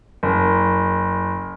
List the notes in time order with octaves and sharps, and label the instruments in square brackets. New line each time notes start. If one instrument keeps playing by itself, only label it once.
[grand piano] F#1